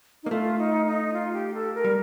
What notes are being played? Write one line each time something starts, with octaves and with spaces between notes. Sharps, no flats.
D#4
A#3
A3 F4
D#4
D#4
F4
G4
A4
A#4
G3